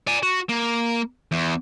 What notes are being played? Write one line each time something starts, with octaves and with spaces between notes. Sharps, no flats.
D5 G#5
F#4
A#3
E2